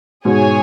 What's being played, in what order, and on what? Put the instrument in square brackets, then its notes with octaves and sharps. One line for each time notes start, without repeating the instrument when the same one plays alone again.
[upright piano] G#2 B2 [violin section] G#4 C#5 G#5